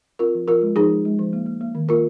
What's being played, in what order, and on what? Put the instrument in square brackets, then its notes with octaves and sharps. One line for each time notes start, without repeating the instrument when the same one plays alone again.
[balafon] C4 F4 A#4
F3
F3 F4 A#4
G#3
F3 D#4 G#4
G#3
G#3
F3
A#3
A#3
A#3
D#3
A#3 F4 A#4